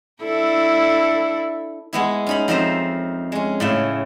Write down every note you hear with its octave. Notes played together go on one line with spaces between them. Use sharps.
D4 E4 A4
G#3 B3 E4
C#4 D#4 B5
F2 D#4 A#4 C5 E5
G#3 C#4
A2 C#3 E5